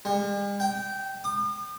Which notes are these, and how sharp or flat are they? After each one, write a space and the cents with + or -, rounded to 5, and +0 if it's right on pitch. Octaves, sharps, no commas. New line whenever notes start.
G3 +45
G5 -15
D#6 -45